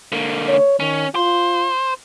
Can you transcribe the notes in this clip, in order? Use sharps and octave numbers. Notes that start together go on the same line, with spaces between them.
D3 A#3
C#5
D#3 C#4
F4 C5